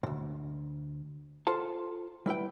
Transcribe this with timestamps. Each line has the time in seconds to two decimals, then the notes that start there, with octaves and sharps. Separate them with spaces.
0.03 D2 G#2
1.47 F4 A4 C5 A5
2.26 G3 E4 B4 G5